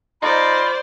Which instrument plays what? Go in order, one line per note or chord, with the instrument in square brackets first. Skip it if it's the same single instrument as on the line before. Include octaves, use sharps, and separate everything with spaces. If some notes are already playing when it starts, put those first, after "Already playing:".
[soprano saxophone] D#4 [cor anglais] F4 [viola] C5 D5 [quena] B5